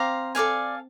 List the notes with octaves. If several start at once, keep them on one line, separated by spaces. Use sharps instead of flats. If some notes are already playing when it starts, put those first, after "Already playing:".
Already playing: C4 C5 F5 A#5 D6
A4 D5 F5 G#5